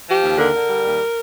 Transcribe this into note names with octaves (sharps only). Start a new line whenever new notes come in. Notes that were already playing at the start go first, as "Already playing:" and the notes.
F3 G4
D#2
D3 A#4
D3
G3
D#2